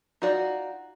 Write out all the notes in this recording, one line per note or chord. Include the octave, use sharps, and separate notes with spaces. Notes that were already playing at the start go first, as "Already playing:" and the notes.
D#4 F4 F#4 D5